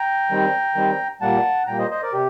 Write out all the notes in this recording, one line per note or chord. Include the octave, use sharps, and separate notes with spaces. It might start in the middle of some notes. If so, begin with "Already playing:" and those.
Already playing: G5 A#5
D#3 G3 C4
D#3 G3 C4
A#2 G3 A#3 F#5 A5
A#2 G3 A#3 G5 A#5
C5 D#5
C5 D#5
A#4 D5
C3 G4